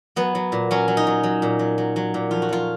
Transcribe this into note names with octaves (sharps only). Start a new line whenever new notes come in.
F#3 B3
F#3
A#2
F#3 C#4
F#3
D#4
F#3
F#3
A#2
F#3
F#3
F#3
A#2
F2 F4
F#4
F#3 F4